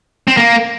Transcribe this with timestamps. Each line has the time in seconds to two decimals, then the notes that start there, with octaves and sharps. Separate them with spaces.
0.28 C4
0.37 A#3